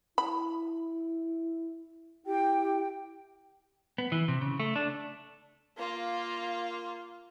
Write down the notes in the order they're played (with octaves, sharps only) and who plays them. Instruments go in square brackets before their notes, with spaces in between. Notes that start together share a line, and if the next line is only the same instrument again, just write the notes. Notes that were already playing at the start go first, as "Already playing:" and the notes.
[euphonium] E4 [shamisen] B5
[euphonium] E4 [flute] G4 [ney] G5
[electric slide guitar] B3
E3
C3
C#3
A3
D4
[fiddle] A#3 F4